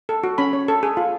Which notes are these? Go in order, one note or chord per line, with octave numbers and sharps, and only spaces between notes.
A4
F#4
C#4 B5
C#5
A4
G#4
F4